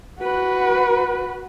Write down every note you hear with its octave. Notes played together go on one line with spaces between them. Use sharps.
F#4 B4